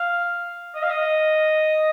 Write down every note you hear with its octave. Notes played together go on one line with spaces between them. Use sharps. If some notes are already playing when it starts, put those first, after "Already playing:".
Already playing: F5
D#5
F5
D#5